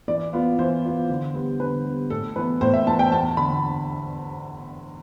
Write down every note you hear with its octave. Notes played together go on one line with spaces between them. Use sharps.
E3 D5
B3 F4
E3 C5
B3 F4
D3
G3 B3
D3 B4
G3 B3
A2 A4
E3 B3 B4
A2 C5
E5
E3 B3 A5
G5
E2 A5
D3 B5